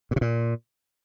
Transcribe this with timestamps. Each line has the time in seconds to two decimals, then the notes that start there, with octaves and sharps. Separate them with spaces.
0.11 A#2
0.16 C3
0.21 A#2